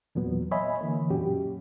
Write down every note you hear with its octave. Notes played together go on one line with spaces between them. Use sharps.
E2 A#2 F#3 B3
C#5 D#5 E5 G#5 B5
D3 E3 A#3
F#2 A#2 F#3 C#4 F#4 G4